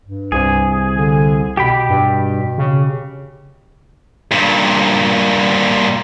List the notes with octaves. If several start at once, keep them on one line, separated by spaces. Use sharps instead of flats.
G2
C2 G#4
D3
B2 G4 G5 B5
G2
C#3
G2 A#2